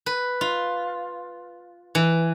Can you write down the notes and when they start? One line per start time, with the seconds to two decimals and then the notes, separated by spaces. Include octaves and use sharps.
0.06 B4
0.41 F4
1.95 E3